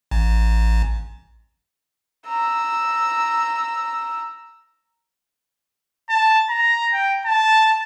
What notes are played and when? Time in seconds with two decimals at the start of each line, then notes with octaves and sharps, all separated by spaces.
0.11 A1
2.27 A#5 E6
6.10 A5
6.50 A#5
6.93 G5
7.25 A5